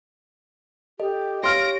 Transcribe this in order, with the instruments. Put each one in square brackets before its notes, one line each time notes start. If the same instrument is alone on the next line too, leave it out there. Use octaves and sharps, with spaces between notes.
[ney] G4 [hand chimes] A4 D#5
[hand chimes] G4 C#5 [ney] F5 [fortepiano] C6 F6 [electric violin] A#6 D7